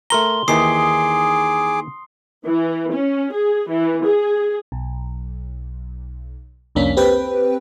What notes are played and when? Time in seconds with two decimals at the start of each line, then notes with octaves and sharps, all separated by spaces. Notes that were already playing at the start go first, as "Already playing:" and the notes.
0.10 A3 A#4 A#5 C6 G7
0.48 D#2 D#3 E3 G#4 D6 D#6 C7
2.49 E3
2.93 C#4
3.34 G#4
3.71 E3
4.06 G#4
4.72 B1
6.75 C2 F2 A#3 C#4 D4 B6
6.97 C4 G4 B4 G5